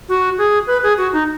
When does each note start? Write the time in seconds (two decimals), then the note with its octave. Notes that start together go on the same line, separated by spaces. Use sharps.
0.09 F#4
0.38 G#4
0.67 B4
0.83 G#4
0.97 F#4
1.13 D#4